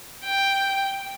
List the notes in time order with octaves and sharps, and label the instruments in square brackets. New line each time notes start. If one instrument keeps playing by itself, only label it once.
[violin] G5